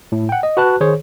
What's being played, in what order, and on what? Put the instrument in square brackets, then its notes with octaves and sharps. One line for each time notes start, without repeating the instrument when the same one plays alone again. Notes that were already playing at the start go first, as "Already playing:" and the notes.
[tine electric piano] A2
F#5 G5
D#5
F#4 B4 A5 F#6
D#3 G#4 C5 C#5